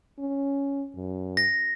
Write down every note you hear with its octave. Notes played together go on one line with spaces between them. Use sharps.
C#4
F#2
A#6